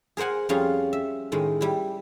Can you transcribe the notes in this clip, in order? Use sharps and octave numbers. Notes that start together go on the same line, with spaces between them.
G#4 A#4 C5 F#5 G#5
F2 G3 C#4 F4 G#4 F5
E5
A2 D#3 G#3
G3 E4